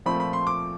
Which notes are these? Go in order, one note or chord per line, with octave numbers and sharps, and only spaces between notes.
A#2 F3 A3 C4 B5
B5
C6
D6